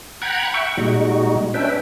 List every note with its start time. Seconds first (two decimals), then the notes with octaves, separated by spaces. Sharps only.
0.22 F#5 G5 A#5 B5 F#6 G#6
0.54 E5 F#5 G5 C#6
0.77 A#2 G3 G#3 D#4 F#4
1.54 C#4 D4 B4 E5 G5